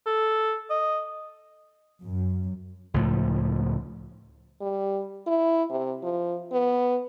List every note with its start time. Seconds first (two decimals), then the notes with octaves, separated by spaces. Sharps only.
0.07 A4
0.70 D#5
2.02 F#2
2.94 C#2 A2 F3
4.61 G3
5.27 E4
5.70 C3
6.03 F3
6.52 B3